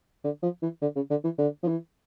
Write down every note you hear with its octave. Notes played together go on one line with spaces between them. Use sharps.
D3
F3
E3
D3
C#3
D3
E3
D3
F3
E3